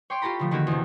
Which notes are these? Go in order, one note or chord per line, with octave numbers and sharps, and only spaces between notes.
C#5 G5 C6 D6
F4 G4 A4 A#5 B5
D3 F3 A3
D3 D#3 A#3 C#4 F#4 G4
E2 C3